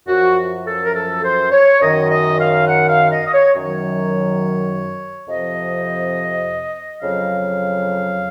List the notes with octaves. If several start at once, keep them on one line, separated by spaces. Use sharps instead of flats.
F#2 F3 F#4
A4
A#4
A4
C5
C#5
F#2 D#3 F#3 D#5
D#5
F5
F#5
F5
D#5
D#5
C#5
F#2 D#3 F#3 C#5
F2 C3 F3 D#5
F2 C#3 F#3 F5